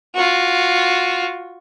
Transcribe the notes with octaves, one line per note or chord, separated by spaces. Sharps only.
F4 F#4